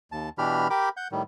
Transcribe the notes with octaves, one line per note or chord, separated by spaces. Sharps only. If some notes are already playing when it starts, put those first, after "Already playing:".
D#2 A5
B2 E3 D4 G4 B5 F6
G4 A#4 G5 B5 D6
F#5 G6
A2 D#3 G3